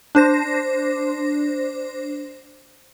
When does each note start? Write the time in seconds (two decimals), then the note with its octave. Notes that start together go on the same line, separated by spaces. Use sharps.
0.15 D4 C5 A#6